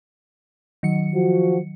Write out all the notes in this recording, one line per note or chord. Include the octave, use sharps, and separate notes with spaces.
D#3 F#3 C#7
F3 F#4